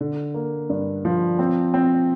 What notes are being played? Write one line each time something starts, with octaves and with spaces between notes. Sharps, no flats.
D3
A#3
G2
F3
C4
C4